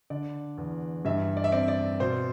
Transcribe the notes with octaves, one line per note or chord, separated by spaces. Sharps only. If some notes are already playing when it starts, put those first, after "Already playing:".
D3 D5
E2
G2 E5
D5
E5
C4 D5
D5
B2 C5